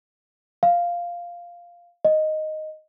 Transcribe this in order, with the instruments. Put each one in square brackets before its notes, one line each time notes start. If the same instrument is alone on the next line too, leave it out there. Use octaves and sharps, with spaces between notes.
[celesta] F5
D#5